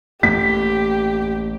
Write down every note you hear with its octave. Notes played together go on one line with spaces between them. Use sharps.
A1 A3 A#3 G4 B6